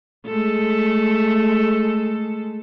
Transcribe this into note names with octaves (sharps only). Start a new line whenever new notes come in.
G#3 A3 A4